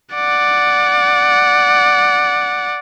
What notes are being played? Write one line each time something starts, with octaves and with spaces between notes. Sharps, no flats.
D5 F#5